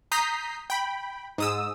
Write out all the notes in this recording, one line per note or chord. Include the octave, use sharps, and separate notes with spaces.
A#5 D#6 G6 B6 C7
G5 B5
G#2 D#6 E6